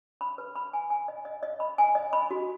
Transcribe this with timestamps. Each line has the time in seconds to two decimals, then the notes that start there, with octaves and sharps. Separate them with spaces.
0.21 B5
0.38 B4
0.56 B5
0.73 G#5
0.90 G#5
1.08 D#5
1.25 D#5
1.43 D#5
1.60 B5
1.78 G#5
1.95 D#5
2.13 B5
2.31 F#4